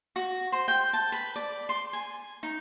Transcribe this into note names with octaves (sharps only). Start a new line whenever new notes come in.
F#4
C5
G5
A5
B4
D5
C6
G#5
D#4